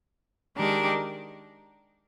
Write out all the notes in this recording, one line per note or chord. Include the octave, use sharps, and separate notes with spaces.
D#3 G#3 D4 G4 A#4